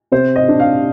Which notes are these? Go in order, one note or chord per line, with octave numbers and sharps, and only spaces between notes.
C3 C5
D#5
D4
F5